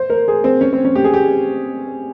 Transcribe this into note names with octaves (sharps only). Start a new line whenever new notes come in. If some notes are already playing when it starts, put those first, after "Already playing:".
Already playing: C5
A#4
G#4
C4
C#4
C4
C#4
G4
G#4
G4